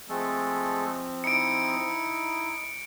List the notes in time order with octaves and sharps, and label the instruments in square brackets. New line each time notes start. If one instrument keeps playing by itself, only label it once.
[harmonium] F3 C4 [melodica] G#3 A3 A4
[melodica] D#4 E4 [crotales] C#7 D7